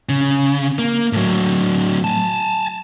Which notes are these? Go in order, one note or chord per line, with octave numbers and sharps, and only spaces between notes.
C#3
A#3
A2 F#3
G#5 A5